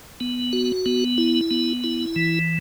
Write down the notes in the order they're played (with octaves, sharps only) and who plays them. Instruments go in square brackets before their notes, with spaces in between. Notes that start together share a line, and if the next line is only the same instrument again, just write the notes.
[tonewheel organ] B3
F#4
B3
E4
B3
E4
E3